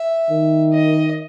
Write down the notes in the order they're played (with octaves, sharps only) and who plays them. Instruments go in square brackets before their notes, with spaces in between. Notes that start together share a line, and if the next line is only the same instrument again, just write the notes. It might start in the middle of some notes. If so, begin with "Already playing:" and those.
Already playing: [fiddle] E5
[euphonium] D#3
[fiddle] D#5